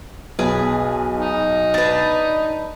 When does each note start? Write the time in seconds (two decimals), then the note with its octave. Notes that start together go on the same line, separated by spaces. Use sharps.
0.39 B1 G#4 B4
1.18 D#4
1.74 D4 B4